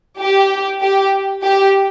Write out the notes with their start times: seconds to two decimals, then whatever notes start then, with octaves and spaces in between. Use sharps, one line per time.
0.19 G4
0.82 G4
1.44 G4